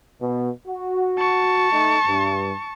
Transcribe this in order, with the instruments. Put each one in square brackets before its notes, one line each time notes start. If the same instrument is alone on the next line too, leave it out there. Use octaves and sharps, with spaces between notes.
[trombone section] B2
F#4
[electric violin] A5 C#6
[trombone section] A3 D#4
G2